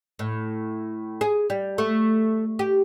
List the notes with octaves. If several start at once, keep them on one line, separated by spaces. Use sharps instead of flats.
A2
G#4
G3
A3
G4